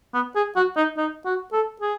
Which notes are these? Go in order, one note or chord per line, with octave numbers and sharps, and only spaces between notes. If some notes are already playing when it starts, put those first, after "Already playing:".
B3
G#4
F#4
D#4
D#4
F#4
A4
G#4